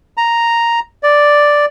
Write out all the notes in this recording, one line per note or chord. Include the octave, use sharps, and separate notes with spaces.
A#5
D5